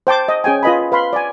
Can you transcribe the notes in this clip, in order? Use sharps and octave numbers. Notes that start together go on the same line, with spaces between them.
C5 G5 A5 D6
D#5
C#4 G#4 G5 G#5
F4 B4 D#5 G#5 B5
B4 F5 B5 C6
D5 G#5